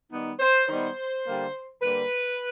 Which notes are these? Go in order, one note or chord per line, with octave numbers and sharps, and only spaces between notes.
D#3 G3 B3 D#4
C5
D#3 G3 B3 D#4 C5
D3 G3 A#3
D3 G3 A#3 B4